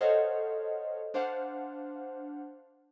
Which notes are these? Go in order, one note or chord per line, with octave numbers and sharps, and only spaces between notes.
A4 C5 C#5 D#5 F5 F#5
D4 C5 F5 F#5